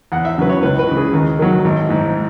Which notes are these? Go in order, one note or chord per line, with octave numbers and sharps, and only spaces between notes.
E2 F#5
E5
C#3 F#3 B4
C#5
C#2 B4
B4
C#3 E3
G#4
D#2
D#3 F#3
G#1
G#2 E3